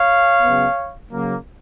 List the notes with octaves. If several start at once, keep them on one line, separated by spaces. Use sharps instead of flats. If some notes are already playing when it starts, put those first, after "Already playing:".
Already playing: C#5 F5
C#3 F#3 B3
C#3 F#3 A#3